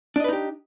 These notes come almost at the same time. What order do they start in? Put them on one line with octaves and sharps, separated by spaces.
D4 D#5 B4 D#4 G4